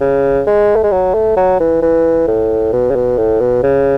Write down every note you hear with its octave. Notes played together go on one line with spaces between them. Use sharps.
C#3
G#3
A3
G#3
F#3
A3
F#3
E3
E3
A2
B2
C#3
B2
A2
B2
C#3